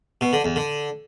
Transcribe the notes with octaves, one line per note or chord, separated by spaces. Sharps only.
B2
D3
E2
D3